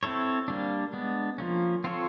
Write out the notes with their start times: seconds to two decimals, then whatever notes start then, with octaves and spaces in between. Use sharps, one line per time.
0.03 C4 E4 A4 C#5
0.48 G3 A#3 D4
0.93 G#3 B3 D4
1.38 F3 A#3 C#4
1.84 C4 F4 A4 C#5